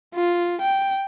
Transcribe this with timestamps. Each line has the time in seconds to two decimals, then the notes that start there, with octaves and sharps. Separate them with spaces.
0.15 F4
0.61 G5